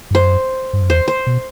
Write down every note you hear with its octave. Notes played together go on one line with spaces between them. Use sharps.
G2
F#2 C5
G2
F#2
E2 C5
C5
B2